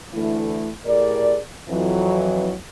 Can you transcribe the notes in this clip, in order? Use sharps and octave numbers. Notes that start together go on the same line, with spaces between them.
D2 E3 A3 E4
A2 G4 G#4 A#4 D5
F2 E3 F#3